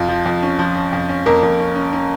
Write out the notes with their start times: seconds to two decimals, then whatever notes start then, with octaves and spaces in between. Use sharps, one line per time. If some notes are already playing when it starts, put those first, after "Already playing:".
Already playing: F2 F4
0.09 F3
0.26 F2
0.43 C#4
0.59 F3
0.76 C#4
0.93 F2
1.09 C#4
1.26 F2 A#3 A#4
1.43 F2
1.60 C#4
1.76 C#4
1.93 C#4